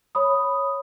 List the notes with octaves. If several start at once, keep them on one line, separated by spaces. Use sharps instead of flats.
C#5 B5 D#6